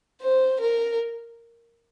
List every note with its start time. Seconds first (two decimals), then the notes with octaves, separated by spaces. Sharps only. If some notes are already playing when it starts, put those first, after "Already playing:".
0.22 C5
0.60 A#4